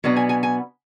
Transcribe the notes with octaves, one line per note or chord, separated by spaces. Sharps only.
B2 F#3 B3 D4
G#5
G#5
G#5